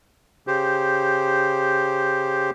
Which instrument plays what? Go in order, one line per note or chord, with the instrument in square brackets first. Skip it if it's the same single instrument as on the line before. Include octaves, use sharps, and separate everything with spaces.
[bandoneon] C#3 G4 C5